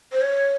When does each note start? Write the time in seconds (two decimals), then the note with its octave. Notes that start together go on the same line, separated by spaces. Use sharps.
0.12 C5
0.22 C#5